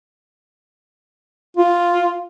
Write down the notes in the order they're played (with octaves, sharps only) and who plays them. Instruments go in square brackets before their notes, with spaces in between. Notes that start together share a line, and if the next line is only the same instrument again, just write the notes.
[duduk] F4